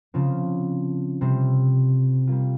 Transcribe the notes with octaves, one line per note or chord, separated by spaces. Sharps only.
C#3 F3 C4 F4
C3 G3 C4
G3 A#3 F4